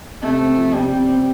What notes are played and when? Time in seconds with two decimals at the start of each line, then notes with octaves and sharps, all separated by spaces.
0.22 C3 A3
0.40 C4
0.57 F3
0.73 C3 G3
0.91 C3
1.08 C4